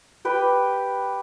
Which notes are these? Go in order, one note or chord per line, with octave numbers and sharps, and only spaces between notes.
G4 B4 G5